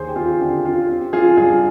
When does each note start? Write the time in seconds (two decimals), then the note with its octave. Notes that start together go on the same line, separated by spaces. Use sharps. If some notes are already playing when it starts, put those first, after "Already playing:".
Already playing: D#2 G#4 C5
0.09 G4
0.16 C4 F4 G#4
0.40 D3 G4
0.65 C4 F4
0.89 C4 G4
1.13 F3 F4 G#4
1.37 G2 F4 G#4